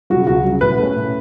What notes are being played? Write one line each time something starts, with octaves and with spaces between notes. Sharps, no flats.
C#3 F#3 F#4
C#2 F#4
C#3 F#3
A2 B4
A3 C#4
A2